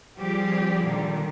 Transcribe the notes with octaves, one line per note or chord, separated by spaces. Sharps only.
F3 G3 C4 G4 G#4
A#2 D3 D#3 G3